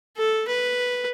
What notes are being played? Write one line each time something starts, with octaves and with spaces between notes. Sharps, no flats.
A4
B4